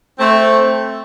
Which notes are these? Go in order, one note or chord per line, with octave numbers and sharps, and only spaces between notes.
A3 C4